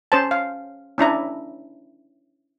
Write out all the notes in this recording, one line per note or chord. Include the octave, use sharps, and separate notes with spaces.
C#4 C5 A5
F5
C#4 D4 E4 A#5